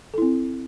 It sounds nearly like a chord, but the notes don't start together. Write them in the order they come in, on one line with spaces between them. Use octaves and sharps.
A4 E4 C4